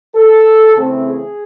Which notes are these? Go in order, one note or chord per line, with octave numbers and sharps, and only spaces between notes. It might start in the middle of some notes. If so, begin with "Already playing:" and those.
A4
C#3 E3 A3 C4
G#4